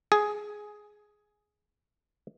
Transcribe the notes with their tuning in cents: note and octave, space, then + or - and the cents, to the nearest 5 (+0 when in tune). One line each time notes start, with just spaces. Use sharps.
G#4 +5